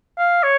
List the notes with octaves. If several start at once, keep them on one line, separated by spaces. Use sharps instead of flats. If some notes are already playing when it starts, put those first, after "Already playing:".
F5
C#5